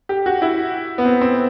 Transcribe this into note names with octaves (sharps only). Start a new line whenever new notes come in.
G4
F#4
E4
B3
C4
C4